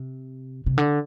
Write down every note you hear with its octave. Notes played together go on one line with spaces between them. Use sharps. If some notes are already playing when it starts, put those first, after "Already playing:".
Already playing: C3
C3
D3